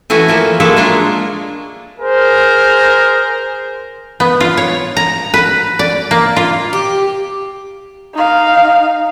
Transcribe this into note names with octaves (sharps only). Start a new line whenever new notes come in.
E3 A3 C#4 E4 F#4
F3 A#3 C#4
F#3 G#3 A#3 E4 A4
G#3 A#3 D4 F4 A#4
G#4 A#4 C5
B3
F4
C#5
A#5
B4
D5
A#3
F4
G4
D#4 F5